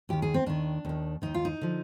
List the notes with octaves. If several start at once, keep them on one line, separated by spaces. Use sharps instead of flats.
D#2 D#3 G4
G#4
C4
D#2 D#3 D4
D#2 D#3
D#2 D#3 D#4
F4
D#4
D3 F3